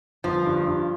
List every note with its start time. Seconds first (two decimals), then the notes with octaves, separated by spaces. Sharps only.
0.24 G1 F3
0.46 G2
0.67 G2